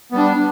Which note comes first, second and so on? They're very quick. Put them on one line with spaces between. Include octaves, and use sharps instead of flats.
B3 G3 D4